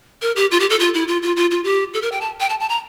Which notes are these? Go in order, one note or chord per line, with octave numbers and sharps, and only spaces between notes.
A#4
G4
F4
G4
A4
F4
E4
F4
F4
F4
F4
G4
A4
A#4
G5
A5
G5
A5
A5
A#5